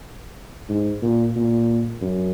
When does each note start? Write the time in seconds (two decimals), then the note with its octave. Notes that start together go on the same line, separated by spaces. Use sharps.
0.69 G#2
1.02 A#2
1.36 A#2
2.01 F#2